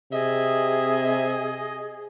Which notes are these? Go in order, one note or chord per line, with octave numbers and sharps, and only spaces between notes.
C3 G#4 D#5 E5